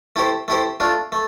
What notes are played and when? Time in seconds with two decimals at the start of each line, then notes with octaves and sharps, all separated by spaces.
0.16 A3 E4 G4 C5
0.48 A3 E4 G4 C5
0.80 A3 D4 F4
1.12 A3